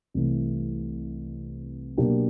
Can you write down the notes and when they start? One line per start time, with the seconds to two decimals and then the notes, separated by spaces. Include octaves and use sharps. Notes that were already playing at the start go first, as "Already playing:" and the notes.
0.14 C2 C3 E3 A3
1.97 B2 F#3 A#3 D4 G4